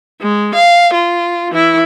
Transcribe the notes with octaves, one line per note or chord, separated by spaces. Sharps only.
G#3
F5
F4
E3 E4